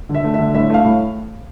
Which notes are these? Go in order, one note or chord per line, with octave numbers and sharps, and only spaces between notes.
D3
E5
A3
D3 E5
A2 E5
A3 F5
A2